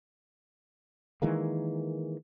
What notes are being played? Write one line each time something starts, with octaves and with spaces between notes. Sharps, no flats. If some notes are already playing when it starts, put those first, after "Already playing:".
D#3 E3 G#3 A#3